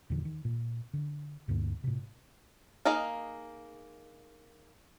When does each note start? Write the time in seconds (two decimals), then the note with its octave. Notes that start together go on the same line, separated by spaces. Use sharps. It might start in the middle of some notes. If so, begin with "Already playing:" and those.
0.10 E2 A#2 D3 F3
0.25 D#3
0.45 A#2
0.93 D3
1.48 D2 G2 D3 A#3
1.84 A2 C3
2.85 A#3 D#4 G#4 D#5 F5